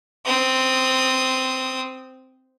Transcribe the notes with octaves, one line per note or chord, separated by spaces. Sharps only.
C4 D#6